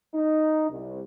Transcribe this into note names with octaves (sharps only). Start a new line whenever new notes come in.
D#4
C2